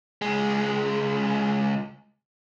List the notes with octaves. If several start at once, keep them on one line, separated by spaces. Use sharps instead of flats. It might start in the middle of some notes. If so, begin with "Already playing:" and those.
C#2 G#3